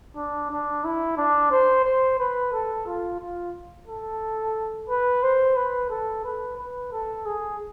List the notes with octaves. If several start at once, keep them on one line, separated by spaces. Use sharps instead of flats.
D4
D4
E4
D4
C5
C5
B4
A4
F4
F4
A4
B4
C5
B4
A4
B4
B4
A4
G#4